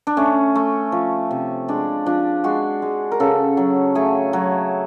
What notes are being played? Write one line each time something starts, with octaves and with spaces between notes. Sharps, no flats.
D4
A3 C#4
A3
F3
C3
G#3 D4
F3 D4
G#3 F#4
G#3
A#4
C#3 A4
F#3
A3 G#4
F#3